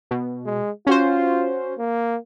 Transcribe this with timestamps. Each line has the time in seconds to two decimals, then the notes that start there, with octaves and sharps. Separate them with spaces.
0.11 B2
0.46 G#3
0.87 C#4 F4 F#4 C5
1.79 A#3